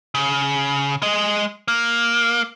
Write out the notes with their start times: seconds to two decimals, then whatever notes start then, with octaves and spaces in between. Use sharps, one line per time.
0.15 C#3
1.02 G#3 D#5
1.68 A#3